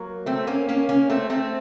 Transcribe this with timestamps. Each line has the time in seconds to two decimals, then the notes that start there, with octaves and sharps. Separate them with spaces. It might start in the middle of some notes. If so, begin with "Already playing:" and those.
Already playing: F#3 A#3
0.26 A3 C4
0.47 A#3 C#4
0.69 A#3 C#4
0.89 A#3 C#4
1.10 A3 C4
1.30 A3 C4